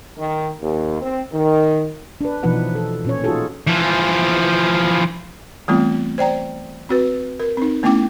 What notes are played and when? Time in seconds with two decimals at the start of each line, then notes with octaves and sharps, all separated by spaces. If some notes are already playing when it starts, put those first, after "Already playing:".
0.18 D#3
0.61 D#2
1.01 C4
1.33 D#3
2.21 D4 B4
2.43 B2 E3 F3 D#4 B4 F#5
2.75 A4
3.05 A#2 C#4 C#5
3.24 D#4 F4 F#4 G#4 A4
3.67 E3 F3
5.68 E3 G3 A3 B3 C4 F4
6.18 C5 D5 G5 A#5
6.89 C4 F#4 B4
7.40 A#4
7.57 C4 D#4
7.83 A3 B3 C#4 E4 G5 D6